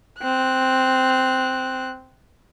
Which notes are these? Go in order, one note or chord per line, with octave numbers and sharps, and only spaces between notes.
C4 F#6